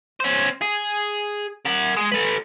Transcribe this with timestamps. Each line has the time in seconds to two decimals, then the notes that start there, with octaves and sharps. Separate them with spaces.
0.20 C#4 C5
0.62 G#4
1.65 A#4 F#5
1.96 G#3
2.12 A4 B4